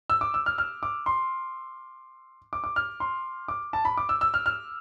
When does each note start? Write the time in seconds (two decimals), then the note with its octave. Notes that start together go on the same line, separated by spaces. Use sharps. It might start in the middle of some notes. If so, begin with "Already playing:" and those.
0.10 E6
0.21 D6
0.34 E6
0.46 F6
0.58 F6
0.83 D6
1.06 C6
2.53 D6
2.64 D6
2.76 F6
3.00 C6
3.48 D6
3.73 A5
3.85 B5
3.97 D6
4.09 E6
4.21 E6
4.34 F6
4.46 F6